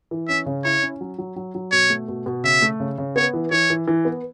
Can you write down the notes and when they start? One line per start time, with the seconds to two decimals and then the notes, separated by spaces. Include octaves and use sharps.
0.11 E3
0.28 C#4 E5
0.46 C#3
0.64 E4 C#5
0.82 C#4
1.01 F#3
1.18 F#3
1.36 F#3
1.55 F#3
1.72 B2 C#5
1.90 A3
2.08 B2
2.26 B2
2.44 C#3 E5
2.62 A3
2.80 C#3
2.98 C#3
3.16 B3 C#5
3.34 E3
3.51 E3 C#5
3.70 E3
3.88 E3
4.05 B3